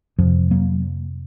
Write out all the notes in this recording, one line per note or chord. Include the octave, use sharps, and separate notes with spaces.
F2 C3 F3
F#3 A#3